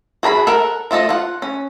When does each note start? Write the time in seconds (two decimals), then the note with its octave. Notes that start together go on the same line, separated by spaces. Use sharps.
0.23 F#4 G#4 A#5 B5
0.47 A4 A#4 F#5
0.91 F3 A3 A4 D#5
1.09 F4 F#5
1.42 C#4